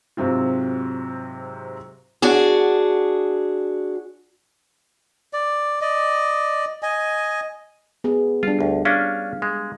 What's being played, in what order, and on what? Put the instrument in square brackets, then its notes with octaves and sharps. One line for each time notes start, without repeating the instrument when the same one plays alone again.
[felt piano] G#2 C3 F#3 C4 F4
[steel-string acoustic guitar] D4 F#4 G#4
[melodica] D5
D5 D#5
D#5 G#5
[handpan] B3 G#4
[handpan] G3 D4 [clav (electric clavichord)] F4
[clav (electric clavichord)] D2
[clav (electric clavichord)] C#4 D4 [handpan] F5
[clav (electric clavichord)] G#3